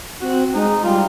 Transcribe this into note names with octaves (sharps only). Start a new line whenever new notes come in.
C4 F#4
G#3 D#4
G3 F4